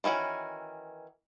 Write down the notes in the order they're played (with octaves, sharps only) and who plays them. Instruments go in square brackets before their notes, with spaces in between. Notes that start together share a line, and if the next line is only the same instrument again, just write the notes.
[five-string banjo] D#3 E3 C#4 F#4